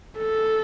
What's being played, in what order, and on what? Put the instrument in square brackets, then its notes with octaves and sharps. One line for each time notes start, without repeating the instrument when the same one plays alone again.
[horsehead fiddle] A4